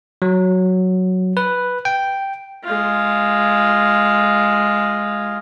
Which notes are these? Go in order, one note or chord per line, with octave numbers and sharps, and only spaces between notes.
F#3
B4
G5
G#3 F4